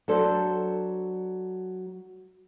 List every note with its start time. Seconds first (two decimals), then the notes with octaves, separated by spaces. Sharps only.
0.08 F#3 D4 A4 C5